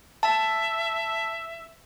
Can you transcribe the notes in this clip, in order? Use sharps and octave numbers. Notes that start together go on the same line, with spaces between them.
E5 A5